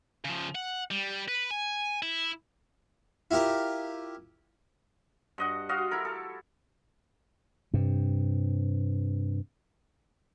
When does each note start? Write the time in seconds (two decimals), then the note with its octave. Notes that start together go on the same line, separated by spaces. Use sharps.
0.25 C#3 F3
0.55 F#5
0.91 G3
1.28 B4
1.51 G#5
2.02 E4
3.31 E4 F4 G4 A#4
5.38 G2 D#5 F#5
5.69 F4 F#4 D#5 F5
5.91 E4 A4 A#4
6.05 A4
7.74 G2 C3